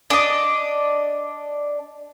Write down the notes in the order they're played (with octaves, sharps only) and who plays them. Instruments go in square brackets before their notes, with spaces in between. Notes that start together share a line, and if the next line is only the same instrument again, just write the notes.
[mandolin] D4 D#5